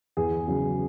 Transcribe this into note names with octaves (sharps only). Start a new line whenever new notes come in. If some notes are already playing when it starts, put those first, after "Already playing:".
E2 G#4
C#3 F#3